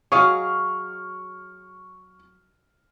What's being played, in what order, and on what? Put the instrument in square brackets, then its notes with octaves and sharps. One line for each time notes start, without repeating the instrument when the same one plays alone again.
[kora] F#3 G#4 [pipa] C#5 D#5 F5 [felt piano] C#6 F6